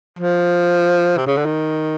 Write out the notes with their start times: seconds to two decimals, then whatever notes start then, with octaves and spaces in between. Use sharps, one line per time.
0.19 F3
1.17 C3
1.27 C#3
1.37 D3
1.45 D#3